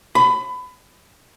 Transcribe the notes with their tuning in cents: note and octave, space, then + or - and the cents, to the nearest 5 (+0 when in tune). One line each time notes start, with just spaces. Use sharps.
B5 +25